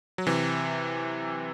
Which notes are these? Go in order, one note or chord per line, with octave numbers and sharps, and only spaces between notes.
F#3
C3 E3